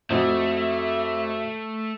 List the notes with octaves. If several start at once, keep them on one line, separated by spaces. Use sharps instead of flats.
F2 A3 F#4 D#5 E5